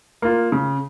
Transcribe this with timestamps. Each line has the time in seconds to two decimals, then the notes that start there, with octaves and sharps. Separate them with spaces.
0.22 A#3 F4
0.52 C#3